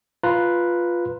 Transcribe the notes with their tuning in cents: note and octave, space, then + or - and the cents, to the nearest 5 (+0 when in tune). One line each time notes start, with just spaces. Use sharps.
F4 +0 B4 +0 A#5 -10